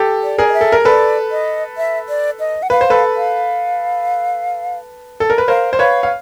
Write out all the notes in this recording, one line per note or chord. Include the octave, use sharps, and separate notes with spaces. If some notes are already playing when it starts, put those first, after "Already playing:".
Already playing: G4 A4
D5
G#4 A#4
D#5
E5
A4
A#4
A4 B4 D5
D#5
E5
D5
D#5
F#5
B4 F5
C5
A4 B4
F5
A4
A#4
B4
A#4 C5 F5
C5
B4 C#5 F5
F5